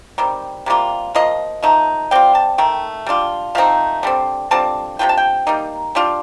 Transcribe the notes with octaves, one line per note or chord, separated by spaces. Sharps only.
D#3 G3 C4
C3 G3 A#3 F4
F3 A#3 F4 D#5
F3 A3 D#4
G3 C4 F4 G5
A5
D#3 A3 G5
G3 D4 F4
F3 A3 C4 D#4 F5
D3 G3 C4
D3 G3 C4 F4 A5
C3 G3 D4 F4 G5
A5
G5
G3 A#3 D#4
G3 D4 F4